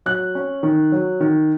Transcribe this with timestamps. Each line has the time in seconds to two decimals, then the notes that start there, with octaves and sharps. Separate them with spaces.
0.06 F#3 F#6
0.35 C#4
0.63 D#3
0.92 F#3
1.20 D#3